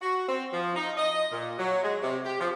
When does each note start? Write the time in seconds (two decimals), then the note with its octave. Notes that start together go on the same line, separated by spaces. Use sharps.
0.02 F#4
0.29 C4
0.53 F3
0.76 D#4
0.97 D#5
1.32 A#2
1.59 F#3
1.84 G#3
2.02 C3
2.25 G4
2.41 F3